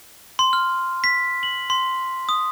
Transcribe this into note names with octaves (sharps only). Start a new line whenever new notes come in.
C6
F6
B6
F#7
C6
D#6